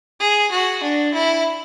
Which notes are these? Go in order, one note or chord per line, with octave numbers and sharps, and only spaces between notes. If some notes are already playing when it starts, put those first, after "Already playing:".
G#4
F#4
D4
E4